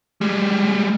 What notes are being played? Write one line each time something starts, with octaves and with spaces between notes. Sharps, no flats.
G3 G#3